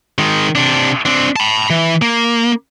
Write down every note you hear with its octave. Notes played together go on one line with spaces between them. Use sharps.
D#3 G#3
C3 D4
C4 D4
A5 B5
E3
A#3